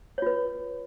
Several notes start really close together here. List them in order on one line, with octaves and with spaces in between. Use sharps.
C#5 F4 B4